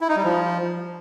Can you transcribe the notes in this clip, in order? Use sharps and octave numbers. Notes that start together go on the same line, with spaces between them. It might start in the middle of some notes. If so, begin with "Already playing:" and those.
E4
D#4
G3
F3